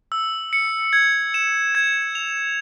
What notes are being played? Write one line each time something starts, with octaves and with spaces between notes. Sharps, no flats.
E6
C#7
G#6
E7
G#6
F7